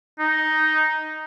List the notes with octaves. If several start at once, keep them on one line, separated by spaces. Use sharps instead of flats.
D#4